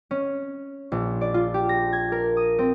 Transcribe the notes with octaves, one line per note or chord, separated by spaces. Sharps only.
C#4
A#1
D5
F4
G4
A#6
G#6
A#4
D#6
C4